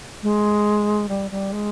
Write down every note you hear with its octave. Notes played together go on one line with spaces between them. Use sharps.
G#3
G3
G3
G#3